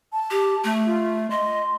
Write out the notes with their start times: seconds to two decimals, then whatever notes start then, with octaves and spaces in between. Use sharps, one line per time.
0.12 A5
0.31 G4
0.64 A3
0.86 F4
1.30 D#5 C6